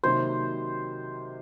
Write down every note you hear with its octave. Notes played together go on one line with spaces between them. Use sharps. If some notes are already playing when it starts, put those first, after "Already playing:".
C3 D#3 F#3 A#3 D#4 C5